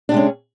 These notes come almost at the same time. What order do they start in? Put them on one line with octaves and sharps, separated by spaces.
D4 C3 G#3 C#4